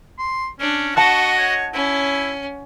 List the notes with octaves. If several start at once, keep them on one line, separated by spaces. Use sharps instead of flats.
C6
C#4 D4
F#4 D#5 F#5 A5 C#6 F#6
C#5
C#4 E4